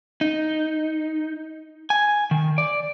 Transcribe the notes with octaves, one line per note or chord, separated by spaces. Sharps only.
D#4
G#5
D#3
D5